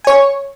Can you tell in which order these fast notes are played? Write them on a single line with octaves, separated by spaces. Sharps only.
G#5 C#5 C#6